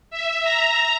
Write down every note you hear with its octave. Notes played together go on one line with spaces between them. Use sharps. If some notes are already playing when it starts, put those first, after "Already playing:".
E5
A#5